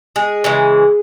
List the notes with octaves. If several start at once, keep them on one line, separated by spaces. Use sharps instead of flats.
G#3 G#4
C#3 E3 G#3